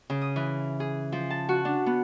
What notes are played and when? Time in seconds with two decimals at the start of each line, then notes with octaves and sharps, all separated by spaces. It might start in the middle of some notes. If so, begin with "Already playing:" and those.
0.10 C#3
0.21 D#6
0.36 E3
0.80 G#4
1.12 F3
1.30 A5
1.49 F#4
1.65 D4
1.86 B3